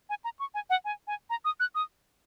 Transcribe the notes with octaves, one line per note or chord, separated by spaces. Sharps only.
G#5
A#5
C#6
G#5
F#5
G#5
G#5
A#5
D#6
F#6
D#6